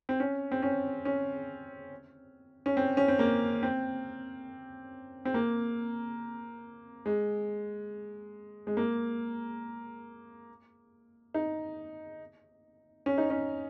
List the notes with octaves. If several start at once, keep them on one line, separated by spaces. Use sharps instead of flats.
C4
C#4
C4
C#4
C#4
C#4
C4
C#4
C4
A#3
C4
C4
A#3
G#3
G#3
A#3
D#4
C#4
D#4
C#4